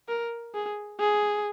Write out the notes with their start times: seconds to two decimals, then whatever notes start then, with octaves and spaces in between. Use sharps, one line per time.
0.09 A#4
0.55 G#4
1.00 G#4